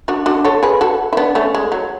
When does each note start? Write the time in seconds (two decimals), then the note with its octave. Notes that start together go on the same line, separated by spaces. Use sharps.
0.08 D4 F#4
0.26 D4 F#4
0.45 A4 C#5
0.63 G#4 B4
0.81 F#4 A4
1.13 E4
1.17 B3 D4
1.35 A3 C#4
1.54 G#3
1.72 F#3